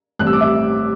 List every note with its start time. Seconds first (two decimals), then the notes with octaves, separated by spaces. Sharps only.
0.19 A1 A2 G3 C4 F#6
0.27 E6
0.33 D6
0.41 E5 E6